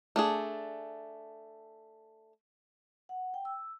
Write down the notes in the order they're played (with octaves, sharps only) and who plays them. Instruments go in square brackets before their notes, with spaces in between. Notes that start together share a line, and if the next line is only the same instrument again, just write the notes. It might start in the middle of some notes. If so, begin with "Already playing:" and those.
[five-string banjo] A3 D4 G#4
[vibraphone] F#5
G5
E6